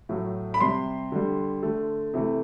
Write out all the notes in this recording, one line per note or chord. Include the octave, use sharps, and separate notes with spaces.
A2 F#3 A3
B5
C3 G3 C6
D3 G3
D3 A3
C3 E3 A3